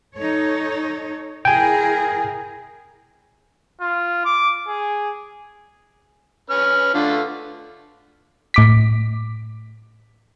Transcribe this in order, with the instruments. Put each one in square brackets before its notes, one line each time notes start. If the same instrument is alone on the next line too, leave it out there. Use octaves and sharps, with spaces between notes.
[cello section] D#4 A4 C#5
[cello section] E4 G#4 A#4 [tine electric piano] G5 G#5
[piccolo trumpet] F4
D6
G#4
[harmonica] C#4 B4 F6
D3 A3 F4
[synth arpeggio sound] A2 D6 B6